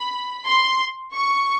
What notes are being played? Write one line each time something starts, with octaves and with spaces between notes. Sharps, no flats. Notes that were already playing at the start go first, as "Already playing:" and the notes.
Already playing: B5
C6
C#6